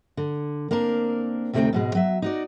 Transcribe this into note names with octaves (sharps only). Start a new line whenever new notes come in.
D3
A#3 C4 D4 A#4
D2 C3 A3 C4 D#4 G5
G#2 B2 G#3
F#3 E5
D#4 F#4 D5